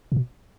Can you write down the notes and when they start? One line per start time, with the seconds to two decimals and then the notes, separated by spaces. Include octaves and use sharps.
0.12 A#2
0.16 B2